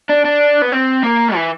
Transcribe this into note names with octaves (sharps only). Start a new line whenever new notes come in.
D4
D4
B3
C4
A#3
E3